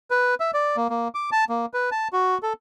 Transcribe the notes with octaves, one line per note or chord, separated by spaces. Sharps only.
B4
E5
D5
A#3
A#3
D6
A5
A#3
B4
A5
F#4
A4